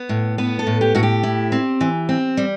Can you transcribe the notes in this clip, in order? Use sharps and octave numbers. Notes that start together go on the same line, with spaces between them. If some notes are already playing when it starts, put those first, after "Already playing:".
Already playing: B3
A2
B3 B4
A4
A2
G4
A2 F#4
G4
E4
C4
E3
C4
G3